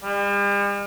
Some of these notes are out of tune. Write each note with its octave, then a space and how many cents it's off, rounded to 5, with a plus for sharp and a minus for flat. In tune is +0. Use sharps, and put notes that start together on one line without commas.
G3 +45